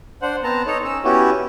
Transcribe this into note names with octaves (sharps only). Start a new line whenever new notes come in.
D4 C5 F#5
B3 C4 A5 A#5
D#4 A4 C#5
C#4 E6
B3 C#4 E4 F#4 G4